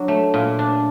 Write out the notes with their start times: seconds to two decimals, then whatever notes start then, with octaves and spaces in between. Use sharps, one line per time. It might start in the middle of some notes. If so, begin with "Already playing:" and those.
Already playing: F#3 D4
0.08 A3
0.34 A#2
0.59 D4